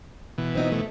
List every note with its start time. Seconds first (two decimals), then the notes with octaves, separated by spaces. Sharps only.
0.38 B2 E3
0.55 C4 D#4 F#4
0.72 A3